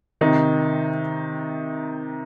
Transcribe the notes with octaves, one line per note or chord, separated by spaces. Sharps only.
C3 D#3 D#4